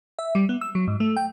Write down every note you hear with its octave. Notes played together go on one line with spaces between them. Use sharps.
E5
G3
B3
E6
F#3
G#2
A3
G5